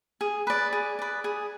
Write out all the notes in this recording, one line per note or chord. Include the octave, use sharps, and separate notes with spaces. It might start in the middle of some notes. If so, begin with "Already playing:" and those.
G#4
B4 D5
G#4
B4 D5
G#4